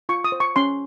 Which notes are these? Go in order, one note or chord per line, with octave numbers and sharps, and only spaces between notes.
F4 C#6
D#6
C5
C#6
C#4 C6